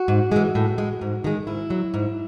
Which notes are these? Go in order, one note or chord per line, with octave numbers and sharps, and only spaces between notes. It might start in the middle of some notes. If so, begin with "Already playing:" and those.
Already playing: F#4
G#2
E3 G#3
A2
G#3
G#2
D#3 G#3
G#2 E4
F#3
G#2